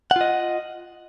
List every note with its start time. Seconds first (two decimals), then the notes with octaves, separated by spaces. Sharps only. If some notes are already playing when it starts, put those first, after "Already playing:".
0.11 F#5
0.16 F4
0.21 D#5